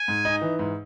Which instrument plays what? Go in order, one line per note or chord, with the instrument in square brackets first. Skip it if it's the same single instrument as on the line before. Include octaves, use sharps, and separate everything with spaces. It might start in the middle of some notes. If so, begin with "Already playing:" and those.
Already playing: [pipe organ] G#5
[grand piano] G#2
D#4
E3
G#2